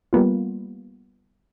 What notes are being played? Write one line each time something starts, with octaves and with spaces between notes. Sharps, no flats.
G3 A#3 B3 F4